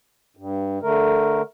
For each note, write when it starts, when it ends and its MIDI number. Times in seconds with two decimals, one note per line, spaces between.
0.37 0.79 43
0.82 1.42 50
0.82 1.42 57
0.82 1.42 70